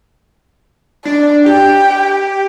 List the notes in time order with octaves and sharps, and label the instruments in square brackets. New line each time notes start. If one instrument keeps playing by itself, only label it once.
[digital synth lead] D4 [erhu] D5
[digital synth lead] G4 [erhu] G5